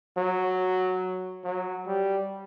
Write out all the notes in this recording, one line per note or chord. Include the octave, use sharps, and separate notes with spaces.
F#3
F#3
G3